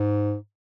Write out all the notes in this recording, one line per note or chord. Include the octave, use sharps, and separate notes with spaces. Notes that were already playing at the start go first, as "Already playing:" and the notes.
Already playing: G#2